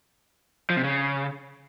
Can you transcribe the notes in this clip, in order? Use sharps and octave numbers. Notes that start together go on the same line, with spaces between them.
F3
C3
C#3